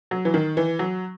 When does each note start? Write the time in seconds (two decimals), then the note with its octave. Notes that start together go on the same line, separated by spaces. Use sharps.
0.11 F#3
0.25 E3
0.34 D#3
0.57 E3
0.79 F#3